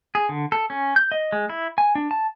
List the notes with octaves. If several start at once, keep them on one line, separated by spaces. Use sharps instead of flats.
G#4
D3
A4
C#4
G6
D#5
G#3
E4
G#5
D4
A5